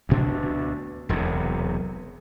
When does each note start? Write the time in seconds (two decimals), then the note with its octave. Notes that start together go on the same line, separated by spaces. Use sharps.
0.09 D2 B2 D4
1.09 E1 B1 E2 C3